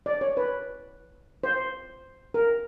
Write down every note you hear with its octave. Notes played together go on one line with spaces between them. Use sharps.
D5
C#5
B4
C5
A#4